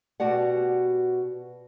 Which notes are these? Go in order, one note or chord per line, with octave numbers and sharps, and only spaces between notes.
B2 F#4 G4 D5 F#5